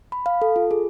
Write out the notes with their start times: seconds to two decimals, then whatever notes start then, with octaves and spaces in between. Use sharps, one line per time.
0.12 B5
0.26 F5
0.42 A4
0.56 F4
0.71 G#4